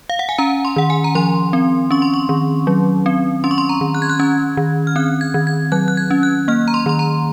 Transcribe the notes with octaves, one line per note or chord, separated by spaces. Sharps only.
F5
F#5
G#5
C#4 A#5
C6
D#3 F#5
G#5
A#5
F3 C6
C4
C#4 C#6
C6
C#6
D#3
F#3
C4
C#4 C6
C#6
C6
A#5
D#3
F#6
G#6
F#6
C#4 G#6
D#3
F6
C4 F#6
G#6
D#3
G#6
F#3 F#6
F#6
G#6
C#4
F#6
A#3 F6
A#5
C6
D#3 C6
A#5